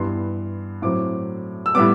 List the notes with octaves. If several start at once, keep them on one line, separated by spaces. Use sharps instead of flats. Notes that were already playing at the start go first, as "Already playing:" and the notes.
Already playing: G2 E3 B3 C6
A2 F#3 C4 D6
E6
A2 G3 B3 D6